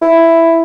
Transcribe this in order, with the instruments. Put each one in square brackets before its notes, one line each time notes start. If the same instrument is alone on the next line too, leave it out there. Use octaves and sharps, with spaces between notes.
[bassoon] E4